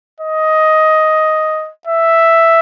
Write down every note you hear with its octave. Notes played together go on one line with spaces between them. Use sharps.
D#5
E5